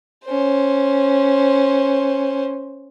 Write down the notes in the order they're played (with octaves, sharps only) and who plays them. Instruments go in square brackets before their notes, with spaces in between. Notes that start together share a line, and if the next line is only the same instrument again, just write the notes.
[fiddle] C#4 C5